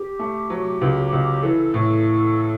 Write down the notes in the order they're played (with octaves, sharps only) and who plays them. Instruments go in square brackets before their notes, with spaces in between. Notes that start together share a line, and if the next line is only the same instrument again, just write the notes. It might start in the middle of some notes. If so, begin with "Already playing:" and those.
Already playing: [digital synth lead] G4
[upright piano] A3
F#3
C#2
C#2
[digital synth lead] G4
[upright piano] E3 [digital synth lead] A4
[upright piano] A2